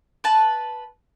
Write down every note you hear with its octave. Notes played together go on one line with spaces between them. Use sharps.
B4 A5